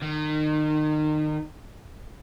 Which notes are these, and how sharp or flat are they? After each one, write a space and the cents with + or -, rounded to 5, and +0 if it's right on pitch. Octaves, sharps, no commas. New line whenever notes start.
D#3 -30